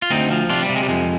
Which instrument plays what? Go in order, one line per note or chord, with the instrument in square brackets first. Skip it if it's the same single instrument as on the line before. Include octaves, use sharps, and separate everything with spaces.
[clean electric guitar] F4
D2 C4 D#4
F3
C3 D4 F4
G3
C3
G#3
G3
F2 G#3